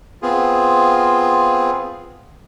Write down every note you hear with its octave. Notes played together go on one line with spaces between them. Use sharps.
B3 C4 F4 G#4